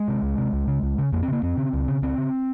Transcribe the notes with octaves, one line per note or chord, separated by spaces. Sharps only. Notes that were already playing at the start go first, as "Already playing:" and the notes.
Already playing: G#3
C3
C#2
C3
C#2
C#3
C#2
C#3
F2 A#3
C4
C#3 A#3
F2 C4
C#3
C#2
C#3
C#2 C4
C#3